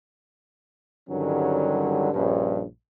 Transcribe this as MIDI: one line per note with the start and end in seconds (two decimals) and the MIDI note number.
1.08 2.11 43
1.08 2.11 50
1.08 2.11 51
1.08 2.11 54
1.08 2.11 55
1.08 2.11 61
2.12 2.64 34
2.12 2.64 43
2.12 2.64 61